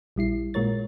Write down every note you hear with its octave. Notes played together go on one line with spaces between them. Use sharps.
A#1 G3 E4 C7
A#2 G#3 F4 A#4 C#5 A6